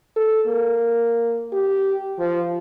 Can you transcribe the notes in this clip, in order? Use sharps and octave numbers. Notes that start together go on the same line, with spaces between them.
A4
A#3
G4
F3